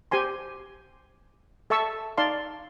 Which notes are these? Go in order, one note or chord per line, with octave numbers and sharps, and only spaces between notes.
G4 C5 G#5 C6
A4 E5 A5 C#6 E6
D#4 D5 F5 A5 C6